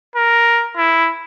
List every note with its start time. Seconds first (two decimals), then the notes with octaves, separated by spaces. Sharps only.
0.16 A#4
0.77 E4